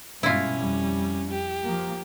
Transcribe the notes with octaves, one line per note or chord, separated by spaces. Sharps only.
G2 B2 G#3 C#4 E4 F4
F2 G3
G4
F3 A#3